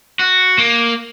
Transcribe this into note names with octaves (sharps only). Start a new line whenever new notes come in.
F#4
A#3